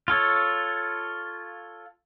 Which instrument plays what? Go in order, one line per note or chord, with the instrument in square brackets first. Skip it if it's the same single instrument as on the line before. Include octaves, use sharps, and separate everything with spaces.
[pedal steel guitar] F4 A4 C#5